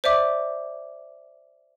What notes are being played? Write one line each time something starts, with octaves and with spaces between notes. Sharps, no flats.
C5 D5 E5 D6